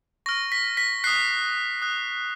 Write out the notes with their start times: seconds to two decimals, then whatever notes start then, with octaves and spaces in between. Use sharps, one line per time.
0.26 C#6 F6 A#6
0.52 B6
0.77 B6
1.04 D#6 F#6 C7
1.82 D#6 F#6